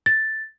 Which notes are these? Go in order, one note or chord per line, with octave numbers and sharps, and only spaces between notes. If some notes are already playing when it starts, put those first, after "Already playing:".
A6